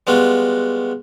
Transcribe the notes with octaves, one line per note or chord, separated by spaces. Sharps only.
G3 G#3 B3 F4 F#4